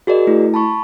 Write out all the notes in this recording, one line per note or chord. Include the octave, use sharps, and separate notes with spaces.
F#4 G#4 A#4 D5 D#5
A3 E4
A5 B5 C#6